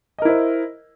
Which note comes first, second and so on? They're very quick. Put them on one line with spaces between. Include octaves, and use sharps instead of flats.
D#5 A#4 E4 C5